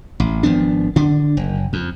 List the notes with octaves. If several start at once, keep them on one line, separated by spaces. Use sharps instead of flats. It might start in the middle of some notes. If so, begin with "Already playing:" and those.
A1
G#1 F3 B3 D4
D3 D4
F#1
F2